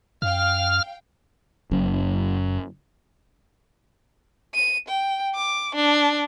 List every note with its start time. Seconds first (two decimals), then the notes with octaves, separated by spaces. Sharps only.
0.22 F#2 F5 G5 F6
1.71 F#1 F#2
4.54 D#7
4.88 G5
5.35 D6
5.75 D4